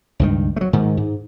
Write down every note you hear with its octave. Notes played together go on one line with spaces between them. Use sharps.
C#2 G2 D#3
F#3 A3
G#2 D#3
G#2